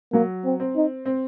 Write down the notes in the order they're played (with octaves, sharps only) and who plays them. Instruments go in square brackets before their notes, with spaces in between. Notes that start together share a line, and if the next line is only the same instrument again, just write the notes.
[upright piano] F#3 [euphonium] A#3
[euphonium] C4
[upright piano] C4
[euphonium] D#4
[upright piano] C4